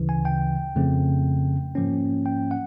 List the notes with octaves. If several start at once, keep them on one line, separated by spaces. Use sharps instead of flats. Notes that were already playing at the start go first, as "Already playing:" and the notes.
Already playing: D2 C#3 E3
G#5
G5
F2 C#3 F3 A3 C4
G#2 F3 A#3 C#4
G5
F#5